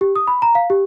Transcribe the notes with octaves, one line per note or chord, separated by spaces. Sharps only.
G4
D#6
B5
A#5
F5
G4